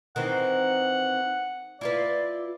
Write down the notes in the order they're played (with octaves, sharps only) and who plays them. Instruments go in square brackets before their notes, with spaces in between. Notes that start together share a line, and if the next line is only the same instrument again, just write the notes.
[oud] D#3 E3 C4 [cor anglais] F#5
[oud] E4 F4 B4 [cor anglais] D5